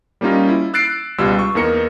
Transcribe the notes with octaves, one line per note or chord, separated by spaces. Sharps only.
G3 A#3 C#4 D#4 F4
E4
E6 F#6 A6 C7 D7
C#2 B2 G3 F4 E6
C#6
E2 A#3 D#4 A#4 C#7